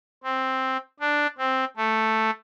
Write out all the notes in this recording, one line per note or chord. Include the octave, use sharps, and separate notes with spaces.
C4
D4
C4
A3